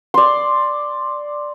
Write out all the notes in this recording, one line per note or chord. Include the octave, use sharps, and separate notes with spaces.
D5 C6